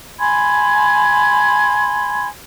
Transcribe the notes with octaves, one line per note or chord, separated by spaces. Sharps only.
G#5 B5 C6 G#6